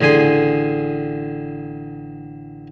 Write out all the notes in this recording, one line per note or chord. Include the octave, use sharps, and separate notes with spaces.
A1 D3 G#4 G#5 C6